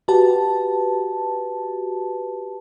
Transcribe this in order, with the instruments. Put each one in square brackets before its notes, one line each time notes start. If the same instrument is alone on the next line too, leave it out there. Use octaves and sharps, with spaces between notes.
[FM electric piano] F#4 G4 B4 A5